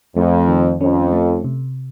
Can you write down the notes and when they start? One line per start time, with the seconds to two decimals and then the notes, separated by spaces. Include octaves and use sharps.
0.16 F2 A3
0.48 D#3
0.81 F2 C#4
1.13 A3
1.44 C3